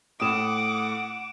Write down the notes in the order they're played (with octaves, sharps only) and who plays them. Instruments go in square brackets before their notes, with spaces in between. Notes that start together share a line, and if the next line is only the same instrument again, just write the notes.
[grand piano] A2 D#6 [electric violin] F#5 D6 [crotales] D7 E7